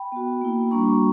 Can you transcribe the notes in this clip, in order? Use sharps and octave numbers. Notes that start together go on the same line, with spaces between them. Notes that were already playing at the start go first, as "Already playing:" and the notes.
Already playing: G5 B5
B3 F#4
A#3 E4
G3 A#3 D4 F#4 A#5 C#6